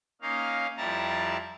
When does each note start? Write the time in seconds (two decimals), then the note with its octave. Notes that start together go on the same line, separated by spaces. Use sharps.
0.21 A#3 C#4 D#4 F5
0.77 F2 G3 E4 A5 A#5